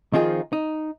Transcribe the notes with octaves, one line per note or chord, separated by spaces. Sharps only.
D#3 F3 C4 D#4 F4 G#4
D#4